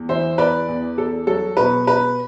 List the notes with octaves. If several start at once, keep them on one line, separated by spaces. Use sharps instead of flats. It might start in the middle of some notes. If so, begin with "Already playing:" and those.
Already playing: E2
E3 C5 E5
E2 B4 D5
E2
E2 A4
F#3 A4
B2 B4
B2 B4